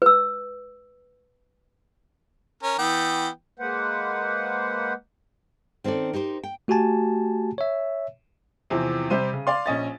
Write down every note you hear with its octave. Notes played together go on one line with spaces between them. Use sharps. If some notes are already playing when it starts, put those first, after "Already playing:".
B4 E6
C#4 A#4
E3 B3 G5
G#3 A#3 B4 C5 F#5
D#3 C4 C#4 A4 D5
D#4 G4 A#4 C5
G5
A3 F#4 G4 G#5 A5
C#5 E5
E2 C3 E3 F3 C4
C3 G3 C5 D#7
C#3
D5 F5 C6
A#1 C#4 D#5 A6